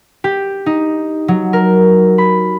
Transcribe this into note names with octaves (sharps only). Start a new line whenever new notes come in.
G4
D#4
F#3
A#4
B5